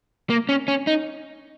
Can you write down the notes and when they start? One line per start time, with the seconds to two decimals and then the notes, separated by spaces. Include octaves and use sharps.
0.30 A#3
0.49 C#4
0.68 C#4
0.87 D#4